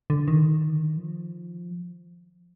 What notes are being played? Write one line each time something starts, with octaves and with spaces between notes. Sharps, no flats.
D3
D#3
F3